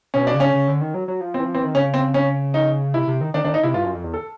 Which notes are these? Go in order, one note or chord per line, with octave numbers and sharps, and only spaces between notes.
B2 C#4
D4
C#3
C#4
C#3
D3
D#3
F#3
F#3
F3
C4
E3
F3
E3 C4
D#3
C#3 C#4
C4
C#4
D#4
C3 E4
C3
D#3
D#3 D4
D#3 D4
D#4
C3 E4
G2 F4
F#2
F2
E2
A4